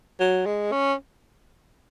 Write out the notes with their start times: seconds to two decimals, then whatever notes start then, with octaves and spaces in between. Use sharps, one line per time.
0.20 F#3
0.46 G#3
0.72 C#4